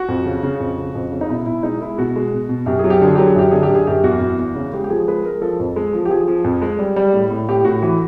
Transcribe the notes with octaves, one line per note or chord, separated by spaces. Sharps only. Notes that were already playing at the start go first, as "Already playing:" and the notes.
Already playing: F#4
F2
C#3
C#3
F2
C#3
F2
C#3
D#4
B2 E4
B2 E4
G#3 D#4
G#3 E4
B2 F#4
G#3
B2
B2
F#2 G4
G#4
F#3
G4
D3 G#4
F#3 G4
G#4
F#2 G4
D3 G#4
G4
F#2 G#4
F#2 G4
E2 F#4
E2
E2
C#3
G#3 G4
G4
F3 G#4
G#3 B4
G#3 A#4
F3 A4
F2
G#3
F3
G4
F3 G#4
F3
F2
G#3
G3
G3
A2
A2
A2 G4
A2 F#4
E3 F#4